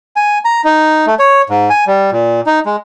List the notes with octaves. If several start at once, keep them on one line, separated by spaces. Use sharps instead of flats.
G#5
A#5
D#4
A3
C#5
G#2
G#5
G3
A#2
D#4
G#3